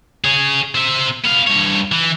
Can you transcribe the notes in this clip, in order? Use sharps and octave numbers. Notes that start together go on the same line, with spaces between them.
G#4 C#5
C4 E5
B3 F5
G2 C#5
E3